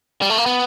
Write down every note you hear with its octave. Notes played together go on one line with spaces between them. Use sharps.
G3
A3
A#3
B3